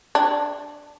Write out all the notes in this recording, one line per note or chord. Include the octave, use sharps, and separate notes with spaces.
D4